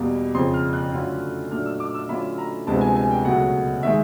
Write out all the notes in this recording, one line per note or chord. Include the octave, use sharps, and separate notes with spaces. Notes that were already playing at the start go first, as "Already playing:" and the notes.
Already playing: E2 B2 G3 A#3
F2 C#3 F3 C6
F6
F#6
D3 F#3 A3 C#4 F4
A#2 F#3 A3 D4 F6
E6
D6
E6
D3 F#3 A3 C#4 F4 B5
A#5
D2 C3 F3 G#3 B3 A5
G#5
G#5
G5
C#2 B2 F#3 A3 F#5
D#3 G#3 E5